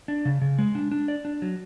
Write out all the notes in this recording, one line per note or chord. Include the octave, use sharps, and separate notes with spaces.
D4
C#3
C#3
G#3
D4
D4
D5
D4
F#3